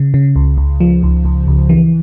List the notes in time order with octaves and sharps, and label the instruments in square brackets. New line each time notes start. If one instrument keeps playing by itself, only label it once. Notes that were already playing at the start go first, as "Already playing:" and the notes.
Already playing: [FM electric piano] C#3
C#3
C#2
C#2
F3
C#2
C#2
C#2
E3